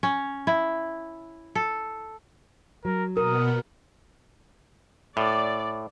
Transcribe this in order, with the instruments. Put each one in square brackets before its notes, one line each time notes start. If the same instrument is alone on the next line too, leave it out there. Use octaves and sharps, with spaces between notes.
[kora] C#4
E4
A4
[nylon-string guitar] F#3 [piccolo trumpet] A#4
[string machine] B2 B3 [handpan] A#4 [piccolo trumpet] D#6
[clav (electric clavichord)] A2 [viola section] D5